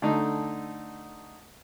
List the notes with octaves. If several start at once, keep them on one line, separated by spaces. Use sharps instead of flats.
D3 A3 D#4